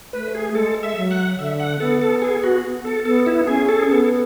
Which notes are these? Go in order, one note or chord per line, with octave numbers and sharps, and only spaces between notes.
A3 B4
G#4
G#3 A4
E5
F#3
F#5
D3 E5
F#5
B3 A4
A4
G#4
F#4
A4
B3 A4
E4
C#4 G#4
A4
G#4
B3 A4